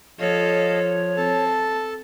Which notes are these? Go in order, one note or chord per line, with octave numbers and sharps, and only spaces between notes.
F3 A4 C#5 D#5 F5
C4 A4 A5